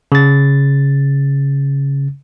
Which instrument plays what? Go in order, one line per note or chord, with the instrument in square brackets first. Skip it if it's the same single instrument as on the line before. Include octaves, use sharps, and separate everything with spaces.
[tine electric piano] C#3 A6